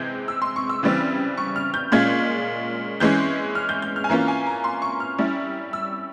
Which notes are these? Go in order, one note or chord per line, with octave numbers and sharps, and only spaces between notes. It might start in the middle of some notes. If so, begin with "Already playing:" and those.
Already playing: C3 E3 G#3 C4 G6 G#6
E6
C6
C#6
E6
C#3 E3 G3 C4
C#6
F6
G6
A#2 G#3 C#4 F4 G#6
E3 G#3 C#4 G6
F6
G6
G6
F6
G#5
E3 A#3 C#4 F4 A#5
G#5
A#5
C6
C#6
F6
G3 C#4 E4
E6